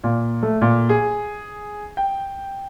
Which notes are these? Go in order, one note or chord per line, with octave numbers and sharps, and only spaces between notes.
A#2
A3
A#2
G#4
G5